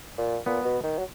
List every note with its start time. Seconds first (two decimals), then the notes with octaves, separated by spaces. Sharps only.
0.18 A#2
0.46 A#2 B3
0.65 B2
0.83 D#3
0.99 F#3